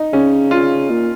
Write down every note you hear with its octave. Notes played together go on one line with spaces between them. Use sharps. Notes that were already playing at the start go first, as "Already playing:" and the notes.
Already playing: D#4
C#3 C#4
F4
A#2